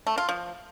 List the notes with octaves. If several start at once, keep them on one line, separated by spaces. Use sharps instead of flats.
A3
F4
F3